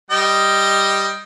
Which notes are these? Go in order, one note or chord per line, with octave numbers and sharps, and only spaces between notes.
G3 D#5 G5